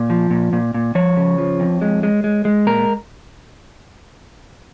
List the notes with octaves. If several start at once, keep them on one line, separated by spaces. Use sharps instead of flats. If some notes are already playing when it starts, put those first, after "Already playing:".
Already playing: A#2
F3
A#2
A#2
A#2
F3 C#5
C#3
F3
F2
G#3
G#3
G#3
G#3
A#2 A#4